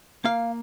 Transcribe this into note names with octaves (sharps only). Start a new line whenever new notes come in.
A#3 F5